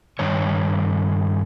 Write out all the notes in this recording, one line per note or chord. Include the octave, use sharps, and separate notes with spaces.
G2 D#3 C#5